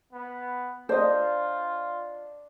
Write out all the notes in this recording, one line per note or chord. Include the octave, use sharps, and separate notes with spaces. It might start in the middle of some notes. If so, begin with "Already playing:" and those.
B3
D4 F4 C5 D#5